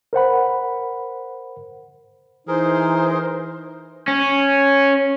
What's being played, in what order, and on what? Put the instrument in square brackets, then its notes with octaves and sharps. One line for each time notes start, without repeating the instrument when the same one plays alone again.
[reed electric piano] A#4 C5 F#5 B5
[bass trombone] E3 [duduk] D#4 [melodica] G#4 A#4 [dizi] C5
[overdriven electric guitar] C#4